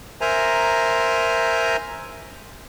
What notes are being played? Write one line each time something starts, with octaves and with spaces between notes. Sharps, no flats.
A#4 C5 E5 G#5 A#5